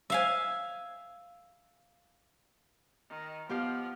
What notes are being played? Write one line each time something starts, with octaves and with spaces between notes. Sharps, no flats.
E5 F5 G#5
D#3
F3 B3 G4 F5